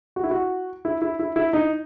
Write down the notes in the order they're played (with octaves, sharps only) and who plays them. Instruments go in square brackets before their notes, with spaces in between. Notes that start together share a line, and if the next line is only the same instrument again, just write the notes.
[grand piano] F#4
E4
F#4
E4
E4
E4
E4
D#4